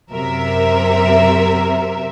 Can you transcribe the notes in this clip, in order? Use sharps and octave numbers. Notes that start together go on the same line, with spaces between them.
F#2 C3 A#4 E5